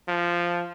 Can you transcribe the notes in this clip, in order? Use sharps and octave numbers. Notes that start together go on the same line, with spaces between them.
F3